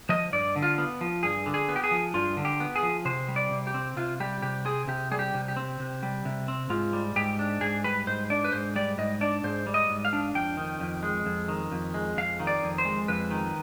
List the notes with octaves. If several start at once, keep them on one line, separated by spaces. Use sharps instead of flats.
F3 D#5
G2 D5
D3
F4
B3
F3
G2 G#4
D3
G#4
B3
G4
G#4
F3
G2 F4
D3
G4
B3
G#4
F3
C3 C5
G3
D5
C3
G4
C4
C3 F4
G3 G4
C3 G4
C4 G#4
C3 G4
G3 G#4
G4
C3
G4
C4
C3
G3
C3
C4
G#2 F4
G3
G#2 G4
D4
G#2 G#4
G3 B4
G#2 C5
D4 D5
B4
G#2 C5
G3 D5
G#2 D#5
D4 D5
G#2 C5
G3
D#5
G#2
F5
D4
F2 G5
D#3
F2
G#3
F2
D#3
F2
G#3
F2 F5
D#3
D5
F2
C5
G#3
F2 B4
D#3